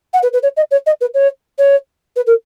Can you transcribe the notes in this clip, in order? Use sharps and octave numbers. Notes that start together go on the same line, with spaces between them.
F#5
B4
B4
C#5
D#5
C#5
D#5
B4
C#5
C#5
B4
A#4